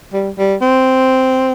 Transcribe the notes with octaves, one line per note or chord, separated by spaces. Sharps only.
G3
G3
C4